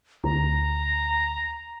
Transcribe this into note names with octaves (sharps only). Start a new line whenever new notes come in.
D2 A#5